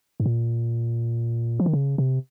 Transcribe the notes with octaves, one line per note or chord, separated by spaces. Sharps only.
G#2
A#2
F3
D#3
C#3
C3